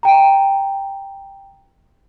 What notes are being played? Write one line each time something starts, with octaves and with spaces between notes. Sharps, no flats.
G5 A#5